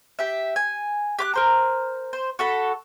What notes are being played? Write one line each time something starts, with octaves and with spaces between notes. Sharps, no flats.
G4 E5
G#5
G4 D6 F#6
A#4 C5 A#5
C5
F#4 A4 B5